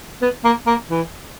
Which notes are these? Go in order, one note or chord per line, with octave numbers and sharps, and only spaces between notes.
B3
A#3
A#3
E3